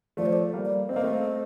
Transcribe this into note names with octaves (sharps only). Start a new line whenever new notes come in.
F3 A3 D5
C5
D5
G3 A#3
D5
C4 D#5
A#3
A3 C4